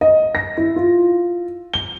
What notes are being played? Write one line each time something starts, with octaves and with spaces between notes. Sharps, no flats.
D#5
A#6
E4
F4
G7